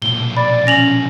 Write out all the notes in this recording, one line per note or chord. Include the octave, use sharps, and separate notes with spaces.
B1 A#2 G7
D5 B5
C#4 A#6 F7 F#7